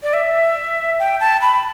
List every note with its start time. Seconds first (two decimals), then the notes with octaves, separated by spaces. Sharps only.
0.03 D5
0.13 E5
0.99 G5
1.20 A5
1.42 B5